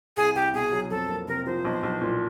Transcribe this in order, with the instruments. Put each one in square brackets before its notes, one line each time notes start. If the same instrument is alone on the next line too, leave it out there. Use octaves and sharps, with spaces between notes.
[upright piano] C2 [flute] G#4
[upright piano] C2 [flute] G4
[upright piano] B2 [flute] G#4
[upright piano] F#3
[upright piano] F2 [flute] A4
[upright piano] A#3
[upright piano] C3 [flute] A#4
[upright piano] F3 [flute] C5
[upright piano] B1
B1
A#2